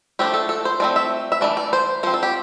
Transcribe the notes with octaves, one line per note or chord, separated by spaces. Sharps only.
F3 A3 D4 G4
A4
A4
C5
F3 A3 C4 D5
E5
E5
E3 A3 D4 D5
D5
C5
F3 C4 C5
A4
G4